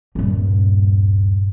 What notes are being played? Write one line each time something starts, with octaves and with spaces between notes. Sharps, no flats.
D#1 G2